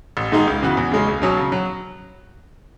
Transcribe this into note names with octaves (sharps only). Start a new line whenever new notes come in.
A1
G#2 D#3 G#3 D#4
C#2
C#3 E3 B3 F#4
E2
C#3 G#3 C#4
C#2
B2 F#3 C#4
C#3
F#3